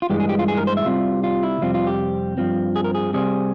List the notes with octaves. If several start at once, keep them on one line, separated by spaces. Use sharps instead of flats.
F4
G2 E3 G#3 G4
G#4
G4
F4
G#4
A#4
C5
E5
C2 C3 G3 F4
F4
E4
F2 C3 G3 C4 F4
F4
G4
G2 F3 C4
G#4
A#4
G#4
C3 G3 C4 G#4